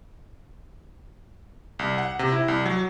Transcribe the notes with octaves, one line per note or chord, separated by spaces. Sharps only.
C2
F#5
C3
E4
C2
F#3